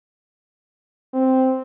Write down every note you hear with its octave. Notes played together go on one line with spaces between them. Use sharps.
C4